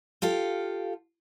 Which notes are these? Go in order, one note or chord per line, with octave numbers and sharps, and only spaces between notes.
F4 G4 A4 F5